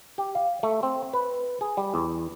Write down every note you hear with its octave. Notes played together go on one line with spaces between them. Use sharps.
G4
F5
A3
C4
B4
G#4
G3
E2